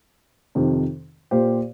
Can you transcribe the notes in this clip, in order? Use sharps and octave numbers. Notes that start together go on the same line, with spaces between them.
F2 C3 D#3
A#2 A#3 G4 C5